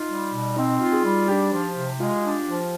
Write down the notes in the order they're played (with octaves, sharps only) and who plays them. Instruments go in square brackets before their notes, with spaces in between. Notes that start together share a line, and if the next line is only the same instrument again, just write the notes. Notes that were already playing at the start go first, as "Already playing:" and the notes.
Already playing: [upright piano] D#4 [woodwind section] F4
[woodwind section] G3
B2
[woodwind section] C4 [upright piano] D#4
[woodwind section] F4
[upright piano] G#4
[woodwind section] G3
[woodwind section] D4 [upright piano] G4
[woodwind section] F3
C3
[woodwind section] G#3 [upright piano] F4
[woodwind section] D4
F3